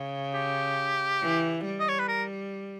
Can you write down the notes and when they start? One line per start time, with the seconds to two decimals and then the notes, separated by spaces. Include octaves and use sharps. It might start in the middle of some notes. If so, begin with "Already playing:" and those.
Already playing: C#3
0.34 G4
1.22 E3
1.65 G3
1.80 D#5
1.89 C#5
1.99 B4
2.08 A#4